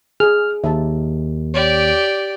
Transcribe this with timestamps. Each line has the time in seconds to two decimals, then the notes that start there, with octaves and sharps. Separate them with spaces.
0.20 G#4 F6
0.64 D#2 E5 A5
1.54 G4 C#5 D5